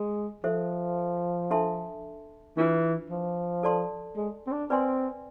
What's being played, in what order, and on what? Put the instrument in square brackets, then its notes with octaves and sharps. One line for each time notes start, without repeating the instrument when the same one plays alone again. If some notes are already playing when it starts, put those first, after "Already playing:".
Already playing: [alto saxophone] G#3
[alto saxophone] F3 [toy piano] A4 C5 E5
[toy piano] D4 A4 E5 A5 C6
[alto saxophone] E3 [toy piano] D4 F4 B4
[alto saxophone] F3
[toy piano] A4 D5 A5 C6
[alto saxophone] G#3
C4
D4
[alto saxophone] C4 [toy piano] B4 D5 G#5 C6